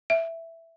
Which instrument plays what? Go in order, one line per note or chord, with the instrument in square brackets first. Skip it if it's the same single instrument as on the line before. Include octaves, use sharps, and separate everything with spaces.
[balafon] E5